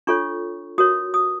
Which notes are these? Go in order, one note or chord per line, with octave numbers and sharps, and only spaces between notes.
D4 F4 A4 C#5 C#6
F#4 A#4 C#5 D#6
D#6